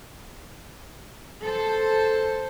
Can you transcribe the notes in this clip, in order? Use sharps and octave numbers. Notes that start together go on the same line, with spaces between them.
A4 C5